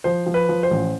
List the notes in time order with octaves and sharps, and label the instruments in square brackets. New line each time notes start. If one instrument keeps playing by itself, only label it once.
[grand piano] F3 C5
F3
B4
F3
C5
A1